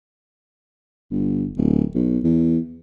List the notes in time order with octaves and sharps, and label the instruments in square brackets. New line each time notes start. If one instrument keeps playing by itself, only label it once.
[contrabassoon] G1
D1
B1
E2